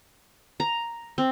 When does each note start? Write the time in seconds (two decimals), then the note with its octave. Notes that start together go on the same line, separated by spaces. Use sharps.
0.60 A#5
1.18 C4